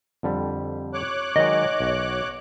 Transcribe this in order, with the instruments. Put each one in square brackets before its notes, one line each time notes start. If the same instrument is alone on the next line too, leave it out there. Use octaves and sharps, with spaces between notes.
[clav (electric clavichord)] F2 D3 G3
[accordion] C#5 D6 F#6
[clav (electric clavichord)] D#3 F#3 G#3 [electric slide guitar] D#5
[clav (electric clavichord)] B1